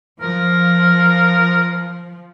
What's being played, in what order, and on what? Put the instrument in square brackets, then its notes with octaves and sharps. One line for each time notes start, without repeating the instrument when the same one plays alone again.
[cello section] F3 [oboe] A#4